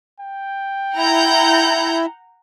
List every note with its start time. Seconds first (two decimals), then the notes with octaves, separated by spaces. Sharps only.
0.20 G5
0.96 E4 F#5 A#5 G6